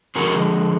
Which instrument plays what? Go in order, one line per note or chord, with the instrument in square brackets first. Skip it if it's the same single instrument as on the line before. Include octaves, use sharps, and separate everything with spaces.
[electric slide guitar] D3 F3 G#3 F#4 A#4